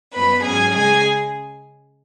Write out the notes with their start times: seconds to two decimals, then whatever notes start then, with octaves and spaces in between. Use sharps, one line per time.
0.14 F#2 F#3 B3 B4 B5
0.43 G#2 F#3 C#4 G#4 G#5
0.73 C#3 G#3 C#4 G#4 G#5